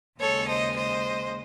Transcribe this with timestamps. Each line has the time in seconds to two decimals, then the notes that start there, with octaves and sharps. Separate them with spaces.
0.19 D#2 C#3 G#3 A4 C#5
0.47 C5 D#5
0.76 C5 D#5